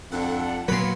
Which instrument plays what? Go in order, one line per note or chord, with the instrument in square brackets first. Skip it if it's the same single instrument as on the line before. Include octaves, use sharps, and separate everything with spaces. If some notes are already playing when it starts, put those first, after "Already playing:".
[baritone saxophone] F2 [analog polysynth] D4 A4 F#5
[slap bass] A#2 F#3 [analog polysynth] B3 C#7 [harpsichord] B4 C6